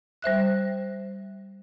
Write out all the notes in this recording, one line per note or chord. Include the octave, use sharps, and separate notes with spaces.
G3 C5 E5 F#6